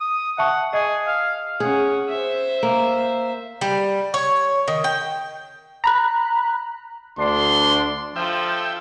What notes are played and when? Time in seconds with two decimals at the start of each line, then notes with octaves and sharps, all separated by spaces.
0.01 D#6
0.38 E5 F#5 A5 C#6
0.73 G#4 D#5
1.07 F5
1.60 C#4 G#4 F#5
2.09 C5 E5
2.63 A#3
3.61 G3
4.14 C#5
4.68 D#3
4.84 G5
5.84 A#5 B5 F#6
7.19 D2 D4 C6
8.16 F3 F4 A4 E5 G5